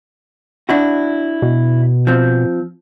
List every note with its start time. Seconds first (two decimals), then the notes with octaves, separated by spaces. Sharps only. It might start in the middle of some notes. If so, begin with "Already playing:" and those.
0.69 D4 E4 F#4
1.42 B2
2.07 F3 C4